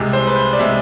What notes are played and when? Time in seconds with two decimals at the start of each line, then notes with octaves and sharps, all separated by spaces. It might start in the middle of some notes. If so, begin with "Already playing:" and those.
Already playing: C2 C3 G#3
0.13 C5
0.27 B4
0.36 C5
0.53 D5
0.59 C3 G#3 E5